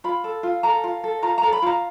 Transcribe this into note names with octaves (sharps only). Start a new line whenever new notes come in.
F4 B5
A4
F4
A4 A#5
F4
A4
F4 A#5
A#5
A4
B5
F4 A#5